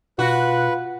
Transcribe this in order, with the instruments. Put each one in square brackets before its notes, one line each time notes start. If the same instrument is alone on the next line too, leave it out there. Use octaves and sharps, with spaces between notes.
[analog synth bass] B2 [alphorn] F4 [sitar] F#4 [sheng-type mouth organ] B4